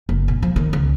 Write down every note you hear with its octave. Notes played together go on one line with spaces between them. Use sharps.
F#1
B2
F3
D#3
C#2